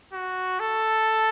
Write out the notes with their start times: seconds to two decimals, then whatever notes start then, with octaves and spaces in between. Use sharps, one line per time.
0.13 F#4
0.60 A4